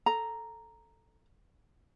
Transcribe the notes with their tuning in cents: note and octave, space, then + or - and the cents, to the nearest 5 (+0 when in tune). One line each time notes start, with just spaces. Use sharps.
A4 +0 A#5 +0